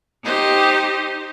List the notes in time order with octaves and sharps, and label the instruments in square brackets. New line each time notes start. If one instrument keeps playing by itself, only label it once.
[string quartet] D#4 G4 C5 D#5